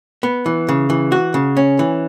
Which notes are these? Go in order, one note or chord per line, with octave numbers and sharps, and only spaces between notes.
B3
E3
C#3
E3
F#4
C#3
C#4
E3